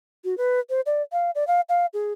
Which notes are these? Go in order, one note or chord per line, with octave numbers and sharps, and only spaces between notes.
F#4
B4
C5
D5
F5
D5
F5
F5
G#4